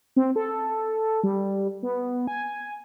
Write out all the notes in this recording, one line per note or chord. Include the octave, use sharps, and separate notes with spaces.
C4
A4
G3
B3
G#5